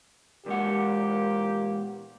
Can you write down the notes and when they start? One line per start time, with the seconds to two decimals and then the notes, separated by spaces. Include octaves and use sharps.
0.46 E2 A#2 G#3 A#3 G4 F#5